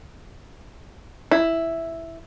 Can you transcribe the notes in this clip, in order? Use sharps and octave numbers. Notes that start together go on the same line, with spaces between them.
E4